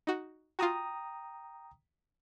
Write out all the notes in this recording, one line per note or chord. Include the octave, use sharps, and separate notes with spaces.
D#4 F#4
F4 F#4 G5 A#5 D#6